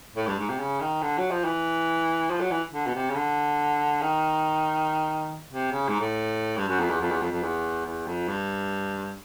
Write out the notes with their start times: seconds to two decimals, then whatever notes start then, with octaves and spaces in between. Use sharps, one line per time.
0.16 A2
0.27 G2
0.39 G#2
0.49 C3
0.59 C#3
0.80 D#3
1.02 D3
1.18 F#3
1.31 F3
1.44 E3
2.30 F3
2.41 F#3
2.51 E3
2.73 D3
2.86 B2
2.95 C3
3.10 C#3
3.15 D3
4.02 D#3
5.51 C3
5.71 C#3
5.89 G#2
6.00 A2
6.58 G2
6.68 F#2
6.79 F2
6.90 E2
7.01 F2
7.11 E2
7.22 F2
7.32 F2
7.43 E2
7.85 E2
8.07 F2
8.28 G2